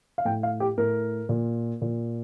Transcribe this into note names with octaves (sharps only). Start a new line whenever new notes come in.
F5
A2 G5
F5
G4
A2 A#4
A#2
A#2